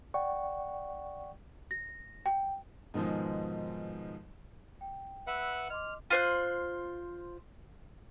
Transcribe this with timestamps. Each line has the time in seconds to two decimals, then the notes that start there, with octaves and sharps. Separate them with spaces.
0.14 D5 F#5 G5 C#6
1.71 A#6
2.26 G5
2.94 G#2 B2 D#3 F3 G#3
4.81 G5
5.27 B4 E5 F#5 E6
5.53 B5
5.70 D#5 C6 D6 F6
6.11 F4 C5 F#6